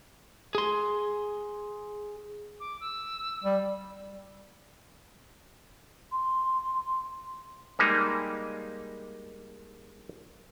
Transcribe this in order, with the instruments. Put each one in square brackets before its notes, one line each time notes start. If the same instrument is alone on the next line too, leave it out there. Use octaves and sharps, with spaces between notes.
[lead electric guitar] G#4 C6
[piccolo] D6
E6
[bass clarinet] G3
[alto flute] C6
[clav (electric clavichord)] G3 G#3 A#3 D#4